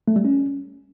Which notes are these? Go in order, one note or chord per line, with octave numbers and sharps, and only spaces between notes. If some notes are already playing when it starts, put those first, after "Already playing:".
A3
G3
C#4